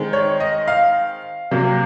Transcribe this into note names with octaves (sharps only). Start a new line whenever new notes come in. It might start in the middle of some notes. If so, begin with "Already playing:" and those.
Already playing: D#3 G#3 C4
C#5
D#5
F5
C3 F#3 A#3